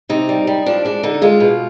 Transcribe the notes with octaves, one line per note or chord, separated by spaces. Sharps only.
C3 D#4
G3
G3
F3 D4
G#3 D4
D3 D#4
G#3 F4
B2